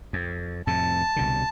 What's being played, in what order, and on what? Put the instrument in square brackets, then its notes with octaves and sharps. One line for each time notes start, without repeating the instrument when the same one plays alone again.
[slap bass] F2
[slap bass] F2 A2 C3 [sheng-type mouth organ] A5
[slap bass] C2 B2 D3